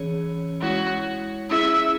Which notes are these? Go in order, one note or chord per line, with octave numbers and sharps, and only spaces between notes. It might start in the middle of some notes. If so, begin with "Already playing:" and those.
Already playing: E3 C#4 G#4 C#5
G#3 E4 F#4 C#5
C#4 E4 G#4 E5